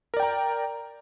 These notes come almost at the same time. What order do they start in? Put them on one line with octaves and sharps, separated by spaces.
A#4 D5 G5 A#5